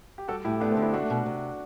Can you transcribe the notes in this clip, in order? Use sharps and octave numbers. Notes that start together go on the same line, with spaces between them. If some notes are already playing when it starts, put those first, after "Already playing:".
G4
G3 F#4 A4
A2 E4 G4
A3 B3 D4
C4
D3
C4 E4
A3 D4 F#4
B2
C3